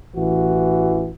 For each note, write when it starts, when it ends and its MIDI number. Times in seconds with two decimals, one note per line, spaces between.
0.16 1.10 33
0.16 1.10 52
0.16 1.10 66